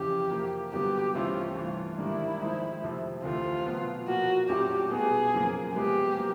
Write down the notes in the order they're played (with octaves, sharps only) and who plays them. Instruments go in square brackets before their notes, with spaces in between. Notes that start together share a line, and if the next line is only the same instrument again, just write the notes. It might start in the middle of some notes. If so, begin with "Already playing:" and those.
Already playing: [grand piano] F2 C#3 E3 [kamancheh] G4
[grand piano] C3 F3 A#3
[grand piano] G2 D3 F#3 B3 [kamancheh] G4
[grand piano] C2 C3 E3 A3 C#4 [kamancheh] F4
[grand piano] G2 E3 A3 [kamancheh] F4
[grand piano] G#2 D#3 G3 A#3 D4 [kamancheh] E4
[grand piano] F3 G#3 C4 D#4
C3 F3 A3
[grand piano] D2 C3 E3 A3 C4 [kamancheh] F4
[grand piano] B2 F#3 B3
[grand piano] A#2 F3 A#3 [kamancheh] F#4
[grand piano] A#2 F#3 A3 C#4 F4 [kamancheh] G4
[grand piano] B2 G3 B3 D#4 [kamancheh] G#4
[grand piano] F#2 C#3 F3 A#3
[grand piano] C3 F3 G#3 B3 [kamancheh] G4
[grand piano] F#3 A#3